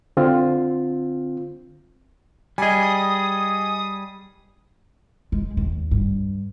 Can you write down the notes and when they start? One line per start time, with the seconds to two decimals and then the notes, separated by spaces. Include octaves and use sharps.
0.17 D3 C4 F4
2.58 G3 G#4 D#5 G#5
2.83 D#6
5.32 G#3
5.57 D#2
5.91 G2